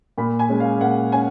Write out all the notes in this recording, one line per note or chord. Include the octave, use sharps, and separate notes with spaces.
A#2 B5
G#5
G#3 C#4
F5
A#2 F#5
C#4 G#5